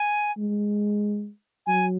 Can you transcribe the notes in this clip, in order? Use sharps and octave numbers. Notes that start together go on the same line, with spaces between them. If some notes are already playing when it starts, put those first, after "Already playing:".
Already playing: G#5
G#3
F#3 G#5